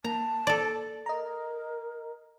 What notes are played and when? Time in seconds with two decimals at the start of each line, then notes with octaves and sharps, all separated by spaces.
0.04 A#3 A5 A#5
0.47 A4 D5
1.06 A#4 D#5 A#5